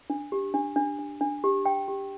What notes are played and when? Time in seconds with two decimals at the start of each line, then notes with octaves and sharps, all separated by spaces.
0.10 D4
0.32 G4
0.54 D4
0.76 D4
0.99 D4
1.21 D4
1.44 G4
1.66 G5
1.88 G4